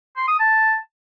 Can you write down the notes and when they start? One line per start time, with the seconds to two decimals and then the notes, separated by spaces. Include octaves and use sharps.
0.17 C6
0.28 D#6
0.39 A5